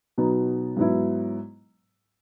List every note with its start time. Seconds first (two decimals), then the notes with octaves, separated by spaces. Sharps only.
0.18 B2 F#3 B3 D#4
0.77 G#2 F#3 B3 E4